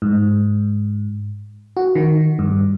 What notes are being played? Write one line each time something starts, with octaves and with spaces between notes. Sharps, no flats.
G#2
F#4
D#3
G2